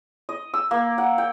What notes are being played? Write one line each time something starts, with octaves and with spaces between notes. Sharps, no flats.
D#5
E6
A#3
F#5
G5